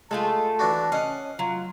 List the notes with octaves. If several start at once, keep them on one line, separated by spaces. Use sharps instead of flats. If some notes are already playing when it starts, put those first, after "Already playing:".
G#3 A3 F4 A4 A5
E3 D4 F#4
C#4 D#5 F5 F#5
F#3 F4